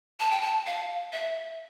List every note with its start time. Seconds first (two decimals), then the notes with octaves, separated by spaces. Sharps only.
0.20 A5
0.31 G5
0.41 A5
0.66 F5
1.12 E5